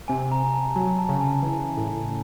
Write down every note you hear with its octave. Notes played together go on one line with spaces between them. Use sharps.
C3 G#5
A#5
C3
A5
F#3 G#5
A5
C#3
G#5
E3
A2